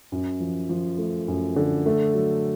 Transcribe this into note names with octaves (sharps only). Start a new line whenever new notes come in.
F#2
F3
F3
A3
F#2
D3
A3
F#3